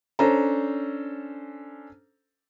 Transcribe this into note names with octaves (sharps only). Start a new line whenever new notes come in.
C#4 D4 A4 C5 A#5